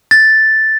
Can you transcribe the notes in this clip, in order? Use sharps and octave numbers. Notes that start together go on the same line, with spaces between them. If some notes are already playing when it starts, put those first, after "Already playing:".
A6